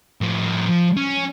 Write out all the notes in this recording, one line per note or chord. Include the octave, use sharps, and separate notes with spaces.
A2 F3
F3
C#4